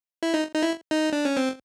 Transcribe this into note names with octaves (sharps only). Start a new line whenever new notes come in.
E4
D#4
D#4
E4
D#4
D4
C#4
C4